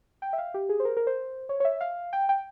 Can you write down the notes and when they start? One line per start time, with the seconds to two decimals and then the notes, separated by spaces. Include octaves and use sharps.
0.22 G5
0.33 E5
0.38 F5
0.54 G4
0.69 G#4
0.80 C5
0.85 A#4
0.97 A#4
1.07 C5
1.49 C#5
1.60 C#5
1.65 E5
1.81 F5
2.13 G5
2.29 G5